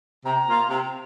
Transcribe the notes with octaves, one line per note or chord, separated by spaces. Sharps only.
C3 A#5
A#3 F4
C3